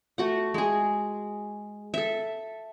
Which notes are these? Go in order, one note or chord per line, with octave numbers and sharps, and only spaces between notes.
A3 F#4 F#5
G#3 G#4
A4 E5